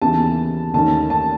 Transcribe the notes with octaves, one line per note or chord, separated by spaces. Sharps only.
D#2 C#3 E3 B3 A5
D#2 D#3 A3 C#4 A5
A5